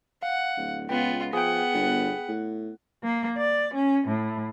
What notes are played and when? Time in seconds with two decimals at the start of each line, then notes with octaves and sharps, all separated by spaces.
0.23 F5 F#5
0.57 D1
0.89 C#2 B3 F4 G5
1.33 F3 B3 G#4 F#5 G5
1.74 G1
2.28 A2
3.03 A#3
3.38 D5
3.75 C#4
4.08 A2